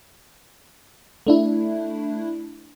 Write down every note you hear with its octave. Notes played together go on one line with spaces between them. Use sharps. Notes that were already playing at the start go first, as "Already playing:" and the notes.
A3 D4 E4